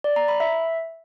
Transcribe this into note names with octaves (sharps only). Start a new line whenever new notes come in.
D5
A#5
B5
E5